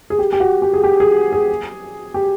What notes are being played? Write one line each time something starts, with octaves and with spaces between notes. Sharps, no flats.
G#4
G4
G4
F#4
G4
G#4
G4
G#4
G#4
G4